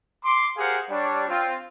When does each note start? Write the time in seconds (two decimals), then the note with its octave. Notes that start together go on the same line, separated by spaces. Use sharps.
0.24 C6 D6
0.58 G4 G#4 A#4 C5 F5 F#5
0.90 G3 D4 C#5
1.27 C4 F4